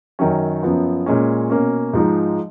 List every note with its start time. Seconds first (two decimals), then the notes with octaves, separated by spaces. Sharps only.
0.19 F#2 D#3 F#3 C#4
0.63 F#2 F3 B3
1.06 A#2 G#3 C#4
1.50 B2 A#3 C#4
1.93 G#2 F3 G#3 D#4